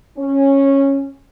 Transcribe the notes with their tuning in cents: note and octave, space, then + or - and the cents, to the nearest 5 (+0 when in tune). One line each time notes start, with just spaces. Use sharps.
C#4 -10